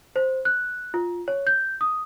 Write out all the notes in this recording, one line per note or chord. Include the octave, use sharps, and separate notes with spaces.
C5
F#6
F4
C#5
G6
D#6